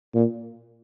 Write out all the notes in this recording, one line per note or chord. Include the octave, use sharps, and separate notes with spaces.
A#2